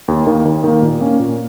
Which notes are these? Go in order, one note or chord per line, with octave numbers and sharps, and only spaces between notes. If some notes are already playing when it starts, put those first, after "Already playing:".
D#2
D#3 A#3
D#2
D#3 A#3
A#2
A#3 C#4
A#2